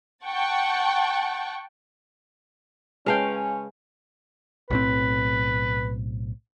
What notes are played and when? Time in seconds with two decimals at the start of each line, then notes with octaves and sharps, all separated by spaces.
0.25 F#5 G5 A5 C#6
3.06 C#3 G#3 C#4 B4 F5 G5 A5
4.70 B1 A2 C4 B4